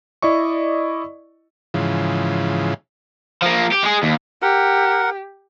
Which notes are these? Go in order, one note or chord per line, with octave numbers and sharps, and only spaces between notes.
E4 D5 D#5 C#6
G#2 C#3 E3 F3
F3 A#3
G4
G#3 G#4
D#2
G4 A#4 F#5